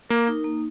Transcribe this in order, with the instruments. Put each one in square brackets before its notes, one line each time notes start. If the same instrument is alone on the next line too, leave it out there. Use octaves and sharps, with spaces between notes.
[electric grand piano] A#3 [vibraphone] A#4
[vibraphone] D#4
A#3